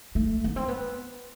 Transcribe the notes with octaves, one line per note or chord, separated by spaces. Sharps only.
A3
B3
C4
B3